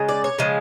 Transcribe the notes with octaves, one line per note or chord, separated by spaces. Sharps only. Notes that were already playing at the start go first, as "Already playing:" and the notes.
Already playing: C#3 G#3
D5
C#5
C#3 F3 G#3